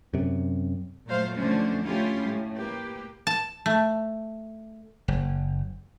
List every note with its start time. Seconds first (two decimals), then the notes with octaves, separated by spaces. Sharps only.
0.14 F#2 C3
1.06 A#2 F#3 A3 C5 F5
1.38 F2 D3 A3 C#4 D4 C5
1.84 A3 C#4 E4 F4 G4
2.24 A2
2.56 A#3 G4 B4
3.27 A5
3.66 A3
5.08 F#1